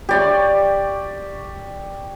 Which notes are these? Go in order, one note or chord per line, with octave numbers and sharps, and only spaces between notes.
G4 D5 C#6